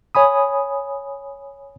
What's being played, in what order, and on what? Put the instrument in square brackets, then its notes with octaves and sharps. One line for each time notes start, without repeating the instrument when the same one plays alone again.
[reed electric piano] C#5 G#5 B5 D#6